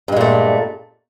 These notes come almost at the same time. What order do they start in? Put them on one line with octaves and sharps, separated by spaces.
G2 G#3 A#2 A3